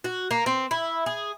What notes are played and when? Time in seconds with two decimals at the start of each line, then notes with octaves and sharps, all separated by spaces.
0.04 F#4
0.31 A#3
0.46 C4
0.71 E4
1.06 G#4